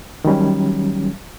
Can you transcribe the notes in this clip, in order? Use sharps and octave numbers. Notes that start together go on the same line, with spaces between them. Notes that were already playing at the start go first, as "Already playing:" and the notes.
D#3 F#3 G3 C#4